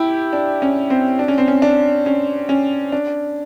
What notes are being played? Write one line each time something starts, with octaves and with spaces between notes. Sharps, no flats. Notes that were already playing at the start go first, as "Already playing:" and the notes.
Already playing: E4 G4
D4
C#4
C4
D4
C#4
C4
C#4
D4
C#4
C#4
D4